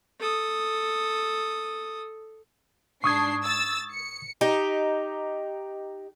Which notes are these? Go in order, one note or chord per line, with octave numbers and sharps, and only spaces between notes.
A4 D#6
G#2 D4 C#6 D#6 G#6 C7
E6 A6
C#7
D#4 G4